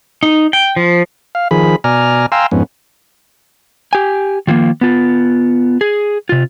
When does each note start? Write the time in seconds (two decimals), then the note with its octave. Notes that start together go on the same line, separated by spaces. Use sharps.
0.23 D#4
0.53 G5
0.76 F3
1.35 F5
1.51 D#3 F3 G#4 B5
1.84 B2 D5 G#5 A#5 F6
2.32 F5 G5 G#5 A#5 C6 E6
2.51 F2 G#2 B3 C#4
3.93 G4 G#5
4.47 D#3 F3 G#3 A#3
4.81 B3 F4
5.81 G#4
6.29 C3 F4